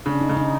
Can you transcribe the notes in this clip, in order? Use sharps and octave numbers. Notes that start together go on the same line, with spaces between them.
C#3 D4
D#4
C#3
D#4